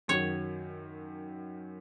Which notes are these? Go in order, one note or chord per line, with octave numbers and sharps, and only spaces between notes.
F#2 D#3 F#3 C#5